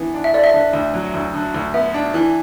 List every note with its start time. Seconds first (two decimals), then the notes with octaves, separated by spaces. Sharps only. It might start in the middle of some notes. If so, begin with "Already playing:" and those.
Already playing: D3 E3 B3
0.14 D4
0.24 E5
0.33 A4 D5
0.44 E5
0.54 D3
0.73 D2
0.94 F#3
1.14 D2
1.34 D3
1.54 D2
1.74 B3 E5
1.94 D4
2.14 E3